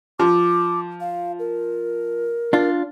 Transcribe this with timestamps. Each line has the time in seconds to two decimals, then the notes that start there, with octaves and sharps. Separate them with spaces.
0.19 F3 D6
1.00 F5
1.39 A#4
2.53 D4 F4